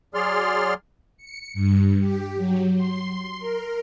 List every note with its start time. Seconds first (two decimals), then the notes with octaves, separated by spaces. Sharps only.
0.14 F#3 G#4 D5 C6 F6
1.17 C#7
1.54 G2
1.99 G4
2.36 F#3
2.76 C6
3.39 A#4